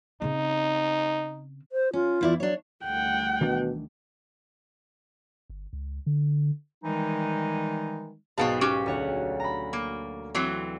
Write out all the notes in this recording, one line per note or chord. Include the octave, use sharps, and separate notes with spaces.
C#3 C4 D#4
C5
C#4 F4
E2 E4 D5
F#3 D4 C#5
D2 G3 F#5 G5
B2 D#3 E3 D4
G1
C#2
D3
D#3 E3 G3 G#3 D#4
B1 G#2 B2 B3 F5 A5
C#4 F#4 G4
D2 C#5 F#5
A#5 B5
A#3
E3 F#3 C4